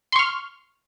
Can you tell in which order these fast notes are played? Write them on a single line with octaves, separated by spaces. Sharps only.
C6 C#6 F6